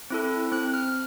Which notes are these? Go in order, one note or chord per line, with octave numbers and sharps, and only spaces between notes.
C4 E4 A4
C4 F#6
F6